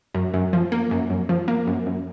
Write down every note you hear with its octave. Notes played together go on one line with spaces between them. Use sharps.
F#2
F#2
F3
A#3
F#2
F#2
F3
A#3
F#2
F#2